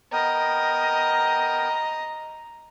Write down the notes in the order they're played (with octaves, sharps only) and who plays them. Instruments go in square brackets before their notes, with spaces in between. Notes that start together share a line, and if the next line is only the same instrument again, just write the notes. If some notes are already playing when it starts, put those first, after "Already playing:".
[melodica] B3 A#4 G5 [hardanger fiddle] D#5 [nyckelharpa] A#5